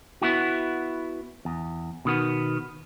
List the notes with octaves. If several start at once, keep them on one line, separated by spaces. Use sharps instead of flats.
B3 E4 F#4
E2
B2 D#3 B3